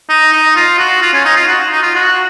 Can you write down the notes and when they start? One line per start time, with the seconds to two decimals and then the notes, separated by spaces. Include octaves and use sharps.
0.09 D#4
0.33 D#4
0.56 F4
0.78 F#4
1.02 F4
1.14 C#4
1.25 D#4
1.36 F4
1.48 F#4
1.71 D#4
1.83 F4
1.95 F#4